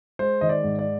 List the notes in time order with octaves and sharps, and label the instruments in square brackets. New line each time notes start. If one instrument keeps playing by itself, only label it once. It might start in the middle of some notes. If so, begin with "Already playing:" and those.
[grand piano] G#3 C5
D#3 D#5
D5
G#2
D5